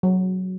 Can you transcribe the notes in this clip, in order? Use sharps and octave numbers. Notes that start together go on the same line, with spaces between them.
F#3